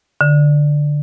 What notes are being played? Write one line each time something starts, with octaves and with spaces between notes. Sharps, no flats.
D3